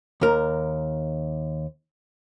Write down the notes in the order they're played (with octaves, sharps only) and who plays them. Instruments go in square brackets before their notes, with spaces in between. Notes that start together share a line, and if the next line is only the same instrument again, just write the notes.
[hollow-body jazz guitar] D#2 A#4